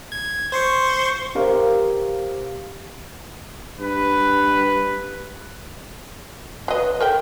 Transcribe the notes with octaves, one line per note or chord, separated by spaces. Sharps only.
G#6
C5 C6 C#6
G4 A#4 C5 F5
G2 B4
F#3 B4 D#5
A4 A#4 E5 G5